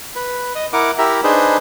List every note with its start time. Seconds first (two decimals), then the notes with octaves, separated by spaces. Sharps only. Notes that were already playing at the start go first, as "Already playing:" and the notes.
0.16 B4
0.55 D#5
0.73 E4 A#4 F#5 D6
0.98 E4 G4 A#4 E5 A#5
1.24 D4 D#4 G#4 B4 C5